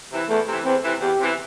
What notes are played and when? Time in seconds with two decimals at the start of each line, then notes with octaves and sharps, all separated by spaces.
0.11 C3 E3
0.29 E2 A3
0.47 C3 E3
0.65 E2 C4
0.83 C3 E3
1.00 E2 G4
1.19 C3 E3